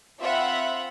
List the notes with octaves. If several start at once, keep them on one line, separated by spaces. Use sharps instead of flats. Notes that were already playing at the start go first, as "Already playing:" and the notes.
C4 F4 E5 F#5 B5